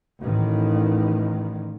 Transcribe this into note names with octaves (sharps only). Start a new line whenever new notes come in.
A1 D#3